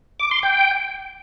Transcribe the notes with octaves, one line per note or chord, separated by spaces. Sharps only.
D6
C6
G5